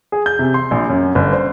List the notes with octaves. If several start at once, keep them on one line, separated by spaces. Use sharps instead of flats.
G#4
G6
C3
C6
A#1
F#2
G1
C5